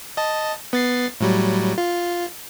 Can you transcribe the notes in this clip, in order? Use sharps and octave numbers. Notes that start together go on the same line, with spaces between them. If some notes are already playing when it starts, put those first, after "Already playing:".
D#5 A5
B3 A6 C7
A2 F#3 G3
F4